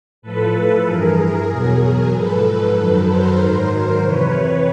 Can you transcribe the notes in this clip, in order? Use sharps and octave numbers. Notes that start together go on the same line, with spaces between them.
A2 F3 A4 B4
G2 E3 G#4 A#4
E2 B2 F#3
G#2 F3 A4 B4
A4 B4
F#2 D#3 F#3 A4 B4
A#4 C5
G#2 D#3 F#3
F2 C3 E3 B4 C#5